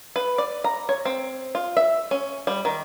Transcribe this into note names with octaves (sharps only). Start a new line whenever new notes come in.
B4
D5
A#5
C#5
C4
F4
E5
C#4
G3
D#3